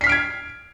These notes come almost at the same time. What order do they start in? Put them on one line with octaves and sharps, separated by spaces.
C7 B6 F6 D7 G#6